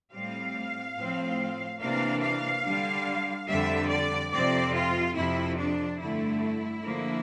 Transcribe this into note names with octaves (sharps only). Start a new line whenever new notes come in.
A2 G3 C4 F5
A2 F3 C4
C3 E3 A#3 D4 F5
F5
D3 G3 D4
F2 D3 G3 E5
D5
F2 C3 F3 C4 D5
F4
F2 C3 F3 E4
D4
G2 D3 A3 E4
D3 F3 A#3